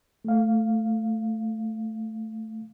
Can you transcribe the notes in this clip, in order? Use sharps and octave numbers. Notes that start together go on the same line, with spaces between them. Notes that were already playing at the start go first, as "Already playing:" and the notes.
A3 F5